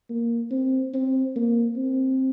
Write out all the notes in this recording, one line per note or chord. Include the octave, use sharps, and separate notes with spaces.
A#3
C4
C4
A#3
C4